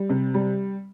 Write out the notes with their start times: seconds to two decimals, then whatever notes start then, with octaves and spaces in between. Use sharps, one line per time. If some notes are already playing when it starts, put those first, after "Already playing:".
Already playing: G3
0.09 C3
0.34 G3